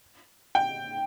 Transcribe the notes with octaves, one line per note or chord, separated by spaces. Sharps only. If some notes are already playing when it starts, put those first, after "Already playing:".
G5